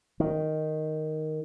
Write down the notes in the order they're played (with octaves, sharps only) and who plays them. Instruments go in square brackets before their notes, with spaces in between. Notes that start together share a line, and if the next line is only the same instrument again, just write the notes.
[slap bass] D#3